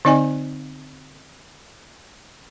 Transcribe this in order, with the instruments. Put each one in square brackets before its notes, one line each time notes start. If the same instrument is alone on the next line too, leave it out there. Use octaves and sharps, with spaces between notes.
[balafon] D3 C4 D#4 D5 D#5 G#5